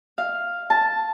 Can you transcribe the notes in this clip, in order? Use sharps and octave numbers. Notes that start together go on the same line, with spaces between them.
F5
A5